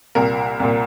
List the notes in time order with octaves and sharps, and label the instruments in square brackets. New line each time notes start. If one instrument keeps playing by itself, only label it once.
[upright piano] C2 A#2 A#4
C2 A#2